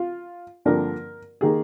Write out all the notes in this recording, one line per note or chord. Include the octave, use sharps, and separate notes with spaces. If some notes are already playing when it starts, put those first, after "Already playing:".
Already playing: F4
G2 D3 F3 A#3 D4 A#4
D#3 A#3 G#4